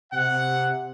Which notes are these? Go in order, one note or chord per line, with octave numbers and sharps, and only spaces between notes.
C3 F#5